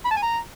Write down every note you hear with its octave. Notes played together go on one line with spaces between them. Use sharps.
B5
A5
G#5
A#5